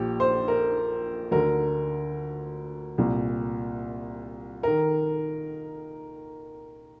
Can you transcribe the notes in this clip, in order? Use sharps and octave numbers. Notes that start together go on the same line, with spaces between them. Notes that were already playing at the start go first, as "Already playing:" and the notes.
Already playing: A#1 A#2 G4
C5
A#4
D2 D3 A#4
C2 A#2
D#3 A#4